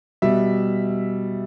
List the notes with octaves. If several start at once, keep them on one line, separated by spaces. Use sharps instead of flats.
B2 G3 E5